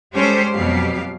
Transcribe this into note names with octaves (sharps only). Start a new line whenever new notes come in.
G3 G#3 C#4 G4 A4 C5
F2 B2 F#3 G4 F5